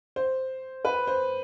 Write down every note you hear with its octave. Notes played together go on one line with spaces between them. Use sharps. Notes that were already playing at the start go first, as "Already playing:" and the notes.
C5
B4
C5